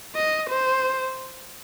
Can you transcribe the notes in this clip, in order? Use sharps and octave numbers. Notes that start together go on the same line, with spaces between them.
D#5
C5